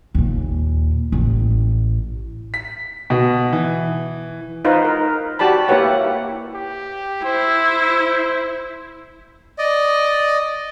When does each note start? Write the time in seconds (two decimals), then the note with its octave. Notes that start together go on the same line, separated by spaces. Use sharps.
0.15 D#2 A#2
1.12 A1
2.54 B6
3.10 B2
3.53 E3
4.65 D#4 F4 B4 C5 F5
4.85 A#4
5.39 F#4 G4 D5 A5 B5
5.68 A#3 E4 G4 B4 C#5 F#5
6.55 G4
7.24 E4 C5
9.58 D5 D#5